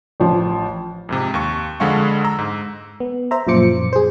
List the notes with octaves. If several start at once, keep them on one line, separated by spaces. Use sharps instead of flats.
A1 F3
F2 G#2 C3
D#2 C#6
F2 D3 G#3 F5 F#5 C#6
A#5 E6
G#2
B3
C5 E5 A#5
F#2 A#2 F3 C5 D6 C#7
G#4 C5